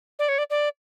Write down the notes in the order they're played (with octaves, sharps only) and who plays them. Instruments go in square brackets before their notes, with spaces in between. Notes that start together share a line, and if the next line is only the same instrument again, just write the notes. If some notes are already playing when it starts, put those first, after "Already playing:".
[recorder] D5
C#5
D5
D5